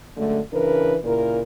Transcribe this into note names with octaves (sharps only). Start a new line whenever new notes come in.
F#2 D3 G#3 A3
C#3 E3 D4 A#4 B4
A#2 C#3 E4 A#4